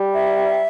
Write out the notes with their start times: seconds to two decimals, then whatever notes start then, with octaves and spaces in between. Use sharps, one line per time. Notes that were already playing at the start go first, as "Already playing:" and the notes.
Already playing: G3
0.14 E5